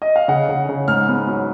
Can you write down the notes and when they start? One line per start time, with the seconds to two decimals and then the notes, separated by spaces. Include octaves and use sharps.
0.02 D#5
0.16 F5
0.28 C#3 F#5
0.49 C#3
0.69 C#3
0.88 G#2 F6
1.08 B3
1.27 F#3